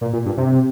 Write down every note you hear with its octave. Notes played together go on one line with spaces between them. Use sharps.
A#2
A#2
G2
C3